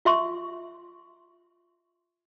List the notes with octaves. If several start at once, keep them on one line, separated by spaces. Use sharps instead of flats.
F4 E5 C6 C#6